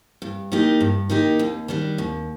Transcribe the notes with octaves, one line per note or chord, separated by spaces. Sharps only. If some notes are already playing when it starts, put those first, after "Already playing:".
G2
D#3 A#3 D#4 G4
G2
D#3 A#3 D#4 G4
D#2
D#3 G3 D4
D#2